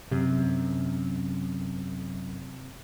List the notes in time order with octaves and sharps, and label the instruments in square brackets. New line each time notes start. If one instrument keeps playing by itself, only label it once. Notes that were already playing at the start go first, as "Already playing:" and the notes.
[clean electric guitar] F#2 [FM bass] C3